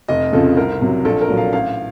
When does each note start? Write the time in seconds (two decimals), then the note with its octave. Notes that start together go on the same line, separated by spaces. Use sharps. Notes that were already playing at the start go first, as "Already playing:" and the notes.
0.08 F1 D#5
0.33 F2 C#3 F3 A4
0.57 C2 A#4
0.81 C3 F#3
1.05 A#1 A4
1.21 A#4
1.28 A#2 F#3
1.37 F5
1.53 A1 F5